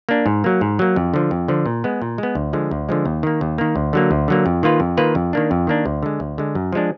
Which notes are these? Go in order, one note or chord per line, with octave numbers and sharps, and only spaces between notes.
A#3 D4
G#2
F#3 A#3
G#2
F#3 A#3
F2
D3 F3
F2
D3 F3
A#2
G#3 B3
A#2
G#3 B3
D2
D3 F3 G#3
D2
D3 F3 G#3
D#2
D#3 A#3
D#2
D#3 A#3
D2
D3 F#3 A#3
D2
D3 F#3 A#3
F2
D#3 A#3 F4 B4
F2
D#3 A#3 F4 B4
F2
D#3 A#3 D4
F2
D#3 A#3 D4
D2
D3 G#3
D2
D3 G#3
F#2
F3 G#3 D4